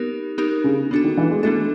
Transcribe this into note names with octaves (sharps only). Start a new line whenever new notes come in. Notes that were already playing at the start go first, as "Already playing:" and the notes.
Already playing: B3 D#4 G4 A#4
B3 D#4 G4 A#4
C#3
D3 B3 D4 F#4 A4
D#3
E3
G#3
A3 B3 D4 F#4 A4